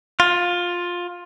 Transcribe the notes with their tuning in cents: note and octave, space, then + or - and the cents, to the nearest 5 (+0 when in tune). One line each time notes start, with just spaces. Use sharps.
F4 +15